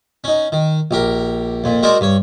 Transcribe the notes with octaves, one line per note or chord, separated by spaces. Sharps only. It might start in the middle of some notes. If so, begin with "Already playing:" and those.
C#4 D#4
D#3
A#1 G4 A#4
F2 A#2
G#3 F#4 G#4 A#4 C5 D5
G2 C#5